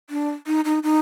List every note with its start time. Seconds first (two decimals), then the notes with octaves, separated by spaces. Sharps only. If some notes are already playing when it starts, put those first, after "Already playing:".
0.10 D4
0.47 D#4
0.65 D#4
0.83 D#4